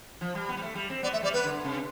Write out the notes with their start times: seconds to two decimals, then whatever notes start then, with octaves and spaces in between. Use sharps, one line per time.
0.21 F3
0.35 G3
0.49 B3
0.57 G3
0.62 A3
0.75 G3
0.90 C4
1.03 B3 D5
1.13 A3 E5
1.23 G3 D5
1.33 B3 B4
1.44 D3
1.65 C3